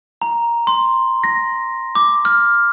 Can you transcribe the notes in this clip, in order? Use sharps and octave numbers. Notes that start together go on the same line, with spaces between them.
A#5
C6
A#6
D6
F6